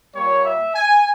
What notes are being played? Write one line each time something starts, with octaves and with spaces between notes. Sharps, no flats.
A#2 G3 A#3 C#5
E5
G#5